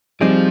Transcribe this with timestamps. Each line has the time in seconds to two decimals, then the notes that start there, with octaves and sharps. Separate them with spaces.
0.21 F3 G3 C4 D#4 G#4 D5